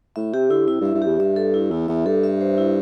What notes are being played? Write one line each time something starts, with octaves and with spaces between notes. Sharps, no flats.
A2 E5
C3 G4
D3 E4
C3 E4
G2
E5
G2
G4
E2
G2 E5
A4
E4
E2 E4
E2 E5
G2 A4
E5
C5
E4